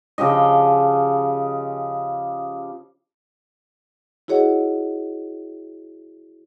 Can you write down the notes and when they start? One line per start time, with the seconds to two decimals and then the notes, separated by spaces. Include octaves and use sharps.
0.18 C#3 F3 G4 D#5
4.28 E4 F#4 G#4 C#5 D#5 F#5